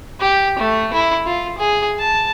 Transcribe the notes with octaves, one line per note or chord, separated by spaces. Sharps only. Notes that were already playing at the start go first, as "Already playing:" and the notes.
G4
A3
E4
F4
G#4
A5